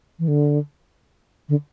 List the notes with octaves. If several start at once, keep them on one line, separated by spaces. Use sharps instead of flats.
E3
D3
D3